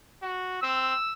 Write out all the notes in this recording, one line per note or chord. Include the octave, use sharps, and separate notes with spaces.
F#4
C4 E6